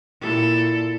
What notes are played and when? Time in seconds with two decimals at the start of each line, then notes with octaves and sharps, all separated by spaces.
0.21 A#2 E4 A4